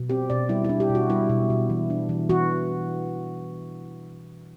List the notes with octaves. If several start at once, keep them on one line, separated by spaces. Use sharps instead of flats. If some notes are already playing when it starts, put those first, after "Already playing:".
Already playing: B2
C4 G4
B2 D5
G3 E4
D4 E4
G4
B2
F#4
G3 E4
B2
B2
E3
D4
E3
E3 F#4